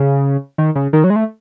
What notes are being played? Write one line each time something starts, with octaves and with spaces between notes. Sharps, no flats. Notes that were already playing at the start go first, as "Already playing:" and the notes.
Already playing: C#3
D#3
C#3
D#3
F#3
G#3
A3